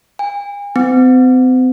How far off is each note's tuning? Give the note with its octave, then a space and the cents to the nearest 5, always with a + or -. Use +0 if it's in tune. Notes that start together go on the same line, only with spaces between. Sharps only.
G#5 -40
C4 -40